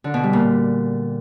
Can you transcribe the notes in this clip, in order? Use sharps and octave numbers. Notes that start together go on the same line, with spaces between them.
D3
B2
G3
A#2